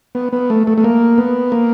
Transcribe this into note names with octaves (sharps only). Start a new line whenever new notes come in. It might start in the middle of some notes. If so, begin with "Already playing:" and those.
B3
B3
A3
A3
A3
A#3
B3
A#3